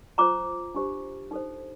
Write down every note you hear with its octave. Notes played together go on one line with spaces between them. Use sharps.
F4 C5 A#5 D6
D4 G4 C5
D#4 A4 C5